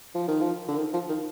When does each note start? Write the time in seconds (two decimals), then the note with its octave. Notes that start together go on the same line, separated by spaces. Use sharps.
0.15 F3
0.29 D#3
0.41 F3
0.68 D3
0.78 D#3
0.94 F3
1.09 D#3